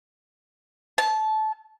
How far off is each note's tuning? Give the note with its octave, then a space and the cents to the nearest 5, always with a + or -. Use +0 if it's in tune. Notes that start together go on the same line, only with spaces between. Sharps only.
A5 -20